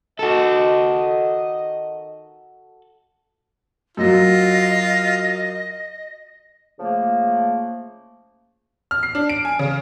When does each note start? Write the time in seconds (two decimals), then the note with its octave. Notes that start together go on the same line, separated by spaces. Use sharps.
0.19 D#3 F#4 A4 D#5
3.97 F#2 F#3 F4 D#5
6.80 C#3 F3 A3 A#3
8.91 F6
9.03 C7
9.15 D4
9.30 D7
9.45 G#5
9.59 C#3